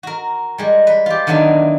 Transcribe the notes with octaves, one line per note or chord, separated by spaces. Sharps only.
F#4 A#4
G3 G#3
B4
F4 G4
D3 D#3 F#3 B3 D4 E4